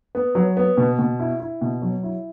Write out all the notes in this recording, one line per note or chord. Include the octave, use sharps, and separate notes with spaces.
B3
F#3
B3
B2
B2
E4
E4
B2
F#3
E4